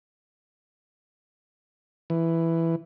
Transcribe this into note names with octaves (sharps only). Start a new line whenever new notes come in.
E3